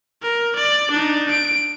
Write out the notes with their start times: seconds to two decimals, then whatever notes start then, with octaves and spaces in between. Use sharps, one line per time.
0.22 A#4
0.56 D5
0.91 D4 D#4
1.31 D7